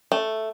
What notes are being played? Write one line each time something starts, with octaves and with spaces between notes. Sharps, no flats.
A3